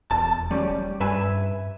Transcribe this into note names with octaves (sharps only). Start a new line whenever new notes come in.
E1 A5
G3 C#4 G4
G2 B4 E5 G#5